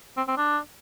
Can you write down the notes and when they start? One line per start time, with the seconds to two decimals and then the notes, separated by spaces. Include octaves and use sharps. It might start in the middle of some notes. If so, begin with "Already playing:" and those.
0.17 C4
0.28 C4
0.38 D4